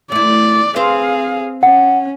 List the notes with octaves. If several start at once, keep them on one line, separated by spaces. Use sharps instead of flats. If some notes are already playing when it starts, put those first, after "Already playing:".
A3 E4 D5
C4 G#4 B4 C5 F5
C#4 F#5